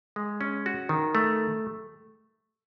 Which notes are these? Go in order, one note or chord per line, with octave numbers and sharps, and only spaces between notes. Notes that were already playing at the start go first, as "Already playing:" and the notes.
G#3
C#4
F#4
D#3
A3